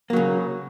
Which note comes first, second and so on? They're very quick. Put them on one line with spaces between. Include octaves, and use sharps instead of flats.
A#3 F#3 C#3